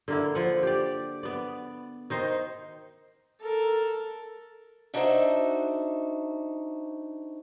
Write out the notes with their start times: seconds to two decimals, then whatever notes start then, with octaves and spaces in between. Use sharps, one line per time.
0.08 D3 A#3 E4
0.35 F3 F#5
0.63 G4 D5
1.23 B3 D5
2.10 D#3 D#4 C5
3.41 A4 A#4
4.94 D4 D#4 F#4 A4 C5 E5